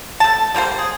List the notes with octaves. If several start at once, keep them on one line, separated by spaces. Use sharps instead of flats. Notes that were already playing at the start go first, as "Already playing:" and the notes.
A3 A5
D3 G3 A#3 C5
G#4